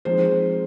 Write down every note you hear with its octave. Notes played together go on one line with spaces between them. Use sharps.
F3 G#3 C4 D#4 C5